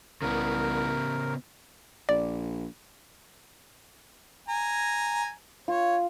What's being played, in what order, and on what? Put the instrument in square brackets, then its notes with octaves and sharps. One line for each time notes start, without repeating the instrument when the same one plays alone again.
[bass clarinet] C2 [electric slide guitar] C#3 B3 [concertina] A#4
[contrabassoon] A#1 [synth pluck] D5
[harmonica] G#5 A#5
[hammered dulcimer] F4 [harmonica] C#5